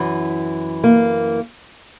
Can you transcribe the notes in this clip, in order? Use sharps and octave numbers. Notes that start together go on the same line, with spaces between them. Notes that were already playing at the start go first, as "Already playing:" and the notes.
Already playing: F#2 E3
A#3